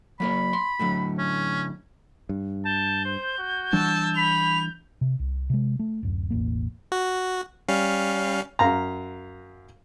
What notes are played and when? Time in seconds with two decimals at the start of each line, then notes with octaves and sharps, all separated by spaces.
0.20 F#3 A#3 C#5 B5
0.53 C6
0.79 A2 D3 F#3
1.18 C#4
2.29 G2
2.65 A5 G6
3.05 C5
3.38 F#4
3.73 E3 G3 D4 A5 E6
4.16 B5 F7
5.01 C3
5.19 C2
5.50 C3 G#3
5.79 A3
6.03 D1 F#2
6.31 E1 A1 A#3
6.92 F#4
7.68 G3 C#4 F5
8.59 F#2 F5 A#5